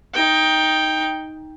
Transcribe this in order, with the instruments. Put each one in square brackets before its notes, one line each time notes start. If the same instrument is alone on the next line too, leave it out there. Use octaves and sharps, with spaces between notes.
[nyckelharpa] D#4 G5